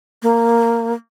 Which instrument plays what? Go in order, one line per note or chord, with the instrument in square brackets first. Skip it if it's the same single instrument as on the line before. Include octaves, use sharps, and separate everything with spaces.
[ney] A#3